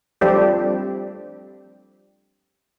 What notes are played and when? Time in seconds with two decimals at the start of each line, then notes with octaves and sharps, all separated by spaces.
0.21 F3 G3 A3 C4 D4 G4